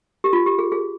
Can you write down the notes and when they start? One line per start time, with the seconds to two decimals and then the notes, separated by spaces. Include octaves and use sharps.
0.24 G4
0.33 F4
0.46 G4
0.59 G#4
0.72 G#4